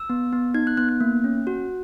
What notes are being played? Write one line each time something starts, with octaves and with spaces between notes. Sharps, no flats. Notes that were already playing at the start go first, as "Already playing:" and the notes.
Already playing: E6
B3
B3
D#4 G#6
F#6
B3 F#6
F#6
A#3
C#4
F#4